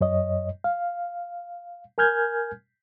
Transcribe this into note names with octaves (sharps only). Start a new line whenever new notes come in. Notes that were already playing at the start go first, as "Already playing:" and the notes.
F#2 C#5 D#5
F5
A#4 G#5 F6 G6 G#6